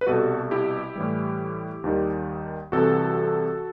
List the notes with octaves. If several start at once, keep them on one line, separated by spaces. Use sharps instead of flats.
B4
C2 B2 G3 F#4 A4
E4 G4
A2 E3 G3
D#2 D#3 G3
C2 C3 E3 F#4 A4